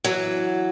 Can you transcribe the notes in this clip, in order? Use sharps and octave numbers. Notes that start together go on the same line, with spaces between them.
E3 F#3